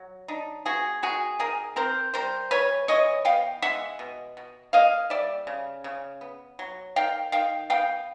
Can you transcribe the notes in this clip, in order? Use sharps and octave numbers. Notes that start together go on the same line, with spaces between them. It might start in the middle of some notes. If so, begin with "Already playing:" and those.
Already playing: F#3
D4 D#4
B3 F#4 G#4
D#3 F#4 G#4
D#3 G#4 A#4
C4 A#4 C5
G3 A#4 C5
E3 B4 C#5
E3 C#5 D#5
B3 F5 G5
G#3 E5 F#5
B2
B2
A#3 D#5 F5
G3 D5 E5
C#3
C#3
B3
F#3
D#3 F5 G5
D#3 F5 G5
B3 F5 G5